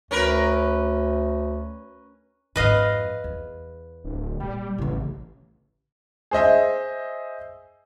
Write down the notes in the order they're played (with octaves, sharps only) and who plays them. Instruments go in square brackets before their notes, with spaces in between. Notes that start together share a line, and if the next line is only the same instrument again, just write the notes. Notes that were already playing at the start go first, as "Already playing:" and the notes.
[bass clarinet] D2 [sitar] C#4 A#4 B4
[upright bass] F2 G#2 [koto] B4 D#5 F5
[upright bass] E2
[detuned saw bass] D1
[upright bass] A#2 [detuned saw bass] G3
[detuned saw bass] A1 [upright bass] C#3 B3
[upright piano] G#4 C5 D#5 E5